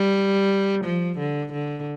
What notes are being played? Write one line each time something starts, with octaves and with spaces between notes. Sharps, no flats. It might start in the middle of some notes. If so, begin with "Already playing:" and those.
Already playing: G3
F3
D3
D3